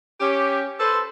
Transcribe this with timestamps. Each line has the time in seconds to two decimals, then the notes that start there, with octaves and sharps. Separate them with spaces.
0.20 C#4 G4
0.80 A4 B4 C5